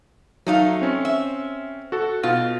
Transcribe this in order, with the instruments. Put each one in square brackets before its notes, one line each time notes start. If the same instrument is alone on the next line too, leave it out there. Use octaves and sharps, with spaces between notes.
[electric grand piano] F#3 [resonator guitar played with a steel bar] A3 D#4 F5
[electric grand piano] C4 C#4
[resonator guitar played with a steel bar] E5
[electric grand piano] F#4 A4
[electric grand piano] B2 [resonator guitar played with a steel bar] F4